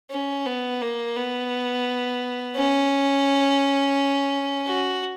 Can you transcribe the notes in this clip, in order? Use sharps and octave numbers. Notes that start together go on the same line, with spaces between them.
C#4
B3
A#3
B3
C#4
F#4